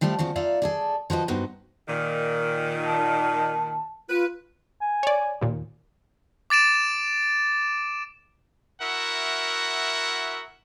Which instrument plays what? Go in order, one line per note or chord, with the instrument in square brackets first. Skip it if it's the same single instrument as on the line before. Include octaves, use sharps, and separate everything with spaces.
[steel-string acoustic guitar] F3 G3 A3 F4 G4
E2 C#3 F3 F#4
D#4 F4 D5 E5 F5
G#4 A4 D5
F3 F#4 B4 D#5
G2 B3 D#4 F#4 B4 C5
[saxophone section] A#2 D#3
[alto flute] A5
[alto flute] F4 [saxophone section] B4
[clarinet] G#5
[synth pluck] C#5 D5
D#2 A#2
[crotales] D6 A6 D7 E7
[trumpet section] E4 F#4 A#4 E5 F#5